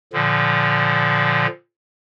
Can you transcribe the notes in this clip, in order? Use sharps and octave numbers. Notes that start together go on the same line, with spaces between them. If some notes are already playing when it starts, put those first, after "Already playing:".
A#2 D3 F3